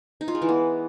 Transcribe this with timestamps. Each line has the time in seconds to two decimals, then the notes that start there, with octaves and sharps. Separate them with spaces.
0.21 D#4
0.28 F4
0.35 G#3
0.42 E3
0.49 B3